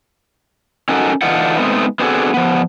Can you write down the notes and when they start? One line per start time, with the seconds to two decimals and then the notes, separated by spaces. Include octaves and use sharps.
0.89 C#4 D#4 F#4 A4 A#4
1.22 D3 E3 D4 D#4 F4 F#5
1.57 G#3 A3 B3 C4 D#4
1.99 B3 C4 D4 F#4 G#4 A4
2.34 F3 B3